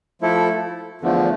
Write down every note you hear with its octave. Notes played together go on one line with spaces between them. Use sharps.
F3 A3 E4 A4
E2 D3 F3 A3